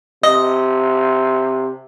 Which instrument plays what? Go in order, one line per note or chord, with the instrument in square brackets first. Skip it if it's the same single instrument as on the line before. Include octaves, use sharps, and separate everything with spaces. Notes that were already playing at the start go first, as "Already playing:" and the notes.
[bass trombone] C3 [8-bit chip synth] D#5